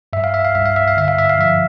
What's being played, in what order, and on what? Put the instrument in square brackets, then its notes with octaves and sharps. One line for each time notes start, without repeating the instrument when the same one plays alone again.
[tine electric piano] G2 E5
F5
E5
F5
G2 E5
F5
E5
F5
D3 E5
F5
E5
F5
F3 E5